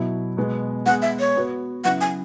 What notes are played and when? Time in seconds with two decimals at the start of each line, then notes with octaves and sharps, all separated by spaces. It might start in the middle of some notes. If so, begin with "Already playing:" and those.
Already playing: B2 F#3 E4
0.37 B2 G#3 B3
0.86 G#3 B3 G#4 F#5
1.02 E5
1.19 C#5
1.36 B3 F#4 B4
1.84 C#3 F#3 E4 B4 F#5
2.01 G#5